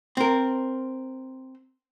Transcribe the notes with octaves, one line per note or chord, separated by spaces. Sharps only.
C4 A#4